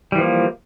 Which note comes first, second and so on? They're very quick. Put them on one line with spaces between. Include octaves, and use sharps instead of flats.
G3 E3 F3 A#3